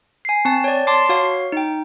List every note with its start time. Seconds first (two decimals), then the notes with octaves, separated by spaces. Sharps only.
0.25 G#5 C7
0.45 C4 A5
0.64 C#5 D5
0.87 A5 C6 D6 C7
1.09 F#4 C#5 F5
1.52 D#4 G5